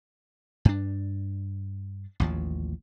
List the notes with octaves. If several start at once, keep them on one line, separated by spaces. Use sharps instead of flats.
G2 D4
A1 D#2 F3